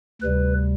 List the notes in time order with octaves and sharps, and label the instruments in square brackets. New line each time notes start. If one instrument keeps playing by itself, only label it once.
[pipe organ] D2 C3 G3 B4